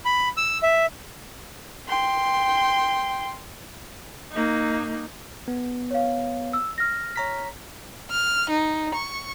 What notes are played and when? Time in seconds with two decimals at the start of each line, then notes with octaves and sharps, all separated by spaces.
0.05 B5
0.37 E6
0.63 E5
1.88 G5 C6
4.32 A#3 D#4
5.48 B3
5.91 C#5 F5
6.53 E6
6.78 F6 A#6
7.16 C#5 A#5 B6
8.11 F6
8.50 D#4
8.95 C#6